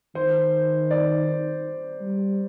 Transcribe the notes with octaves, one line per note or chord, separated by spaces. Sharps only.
D#3 C5
D5
G3